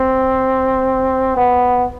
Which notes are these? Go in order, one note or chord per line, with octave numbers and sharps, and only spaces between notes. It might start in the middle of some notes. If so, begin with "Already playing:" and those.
Already playing: C4
B3